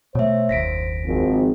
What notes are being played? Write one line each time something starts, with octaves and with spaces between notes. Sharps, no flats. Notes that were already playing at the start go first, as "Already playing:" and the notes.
B2 A3 C5 C#5 E5
F#1 D#2 A#6 B6 D7
G#1 F3